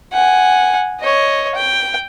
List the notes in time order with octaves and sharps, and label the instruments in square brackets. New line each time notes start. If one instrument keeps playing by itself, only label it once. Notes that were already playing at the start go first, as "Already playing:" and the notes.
[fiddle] F#5 G#5
C#5 D#5
G5